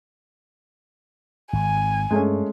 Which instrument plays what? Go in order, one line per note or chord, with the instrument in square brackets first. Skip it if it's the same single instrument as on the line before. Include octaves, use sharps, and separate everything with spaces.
[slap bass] G#1 [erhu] G#5
[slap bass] G2 [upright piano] G#3 A3 C#4